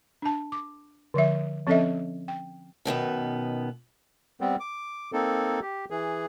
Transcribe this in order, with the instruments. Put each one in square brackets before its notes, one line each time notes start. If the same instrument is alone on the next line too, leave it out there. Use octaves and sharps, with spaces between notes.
[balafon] D4 A5
D6
D3 F3 E5
F3 C4 C#4 A4 D#5 E5
G5
[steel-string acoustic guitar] F#2 B2 D#3 B3
[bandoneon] G3 B3 C4
D6
A#3 C4 D#4 A4
G4
E3 G#4